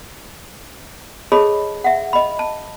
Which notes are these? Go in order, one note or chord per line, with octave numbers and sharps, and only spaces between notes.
G#4 A4 C#5 D#5 A5 B5
E5 F#5
D#5 B5
A5